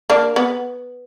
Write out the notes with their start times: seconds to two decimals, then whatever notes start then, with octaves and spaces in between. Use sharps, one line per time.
0.10 A#3 D4
0.36 B3